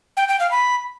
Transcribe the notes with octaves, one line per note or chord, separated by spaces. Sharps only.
G5
G5
F5
B5